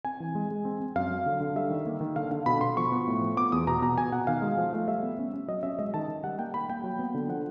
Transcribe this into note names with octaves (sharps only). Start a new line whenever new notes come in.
C4 G#5
E3
G#3
G#3
C4
C4
F#2 F5
F#3
D3
D3
G3 E5
D#3
A#3
D#3
D3 F5
D3 F5
B2 B5
B2 C6
F3 C#6
B3
A2
F3
B3 D6
E2 D#6
B2 A#5
B2 A#5
B2 G#5
B2 F#5
D#3 F5
G#3
F3
A3
G3 E5
B3
C#4
C#4
F#3 D#5
C#4 E5
G#3 D#5
D#3 A5
D#3
G3 F#5
A#3 G5
A#3 B5
A#3 G5
F#3
B3
D3
F3 F#5